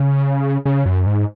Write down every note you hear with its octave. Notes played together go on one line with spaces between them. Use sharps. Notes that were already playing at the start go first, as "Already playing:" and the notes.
Already playing: C#3
C#3
F#2
G#2